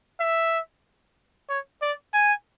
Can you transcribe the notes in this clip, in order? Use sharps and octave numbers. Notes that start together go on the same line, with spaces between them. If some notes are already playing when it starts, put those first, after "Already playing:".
E5
C#5
D5
G#5